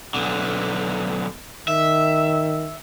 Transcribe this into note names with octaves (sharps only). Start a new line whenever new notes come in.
B1 D3
D#3 E5